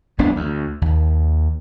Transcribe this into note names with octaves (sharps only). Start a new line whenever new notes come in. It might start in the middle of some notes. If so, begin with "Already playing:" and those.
F1 C2 B3 D4
D2
D#2